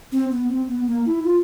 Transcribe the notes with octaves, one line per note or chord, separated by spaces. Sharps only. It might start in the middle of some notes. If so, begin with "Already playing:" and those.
C4
B3
C4
B3
A#3
E4
F4